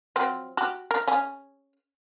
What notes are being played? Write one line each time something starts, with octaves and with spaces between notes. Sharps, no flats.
F3 F#3 C4
F#4 G4
A#4
C#4 G#4